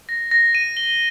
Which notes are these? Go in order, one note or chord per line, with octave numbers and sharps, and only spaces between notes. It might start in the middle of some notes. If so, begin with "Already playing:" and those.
A#6
A#6
D#7
G7